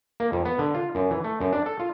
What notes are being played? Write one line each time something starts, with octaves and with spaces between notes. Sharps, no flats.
A#3
F2
B3
D3
F4
F#2
E3
A3
F#2
D4
A4
F4